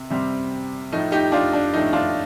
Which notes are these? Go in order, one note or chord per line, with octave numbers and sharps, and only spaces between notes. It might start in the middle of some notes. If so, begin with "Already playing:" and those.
Already playing: C3
C3 G3 C4
A2 F3 A3 D#4
D#4 G4
D4 F4
D4
A2 F3 A3 D#4
D4 F4